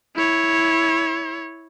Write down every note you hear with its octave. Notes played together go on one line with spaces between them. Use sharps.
E4 C#5